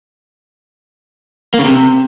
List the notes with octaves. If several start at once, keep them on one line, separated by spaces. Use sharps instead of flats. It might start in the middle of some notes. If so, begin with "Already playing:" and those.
A#3
C#3
C3